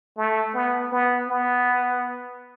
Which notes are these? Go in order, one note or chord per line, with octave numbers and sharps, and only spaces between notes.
A3
B3
B3
B3